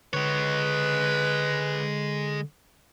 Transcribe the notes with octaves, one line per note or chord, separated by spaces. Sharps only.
D3 G#3 B4 C#5